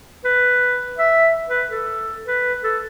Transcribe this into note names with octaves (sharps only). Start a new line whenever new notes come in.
B4
E5
B4
A4
B4
A4